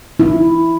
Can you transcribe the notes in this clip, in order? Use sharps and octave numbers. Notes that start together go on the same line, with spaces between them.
E4